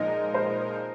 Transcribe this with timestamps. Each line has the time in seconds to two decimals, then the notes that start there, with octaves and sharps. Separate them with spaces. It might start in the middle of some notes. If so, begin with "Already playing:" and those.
Already playing: A#2 F3 G#3 D#4 A#4 D#5
0.34 C5